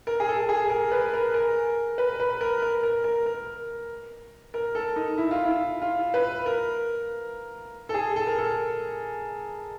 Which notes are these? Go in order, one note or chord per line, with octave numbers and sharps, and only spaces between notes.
A#4
G#4
A4
G#4
A#4
B4
A#4
A#4
B4
B4
A#4
A#4
A#4
A#4
A#4
A#4
A4
D#4
E4
F4
E4
F4
B4
A#4
A4
G#4
A4
A#4
A4